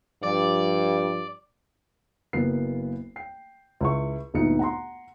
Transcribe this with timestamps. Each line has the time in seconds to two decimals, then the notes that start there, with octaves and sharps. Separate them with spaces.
0.23 G2 F3 D5
2.33 F#1 F#3 A#3 B3 C7
3.16 G5 C7
3.81 C#2 E4 C#6
4.34 G1 D2 A#2 B3 D#4 C#7
4.59 F#5 A#5 C6